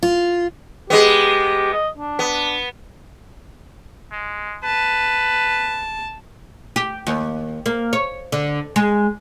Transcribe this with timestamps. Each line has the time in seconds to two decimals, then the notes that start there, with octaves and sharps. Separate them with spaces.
0.03 F4
0.90 G#3 B3 G4
1.73 D#5
1.98 D4
2.19 B3
4.12 G#3
4.64 B4 A5
6.76 G4
7.07 D#2
7.66 A#3
7.93 C#5
8.32 D3
8.76 G#3